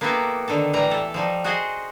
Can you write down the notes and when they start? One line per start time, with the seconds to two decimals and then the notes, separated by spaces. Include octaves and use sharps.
0.01 A#3 B3 E4 F#4 G4 A4
0.48 D3 D#3 A4
0.73 A2 E3 G3 A#5
0.90 B2 A4
1.14 F3 G3 D#4
1.44 F#4 G#4 C5 D#5 G#5